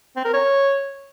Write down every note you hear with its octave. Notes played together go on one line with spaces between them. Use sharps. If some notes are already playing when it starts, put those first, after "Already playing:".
C4
A#4
C#5